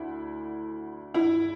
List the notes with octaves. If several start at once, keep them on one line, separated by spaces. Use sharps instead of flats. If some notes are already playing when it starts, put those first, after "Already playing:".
Already playing: D2 D3 E4
E4